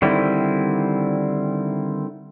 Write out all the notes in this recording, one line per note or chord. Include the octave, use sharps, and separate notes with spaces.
D3 D#3 G3 C4 E4